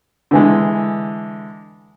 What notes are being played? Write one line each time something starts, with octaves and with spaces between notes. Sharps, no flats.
D3 E3 G#3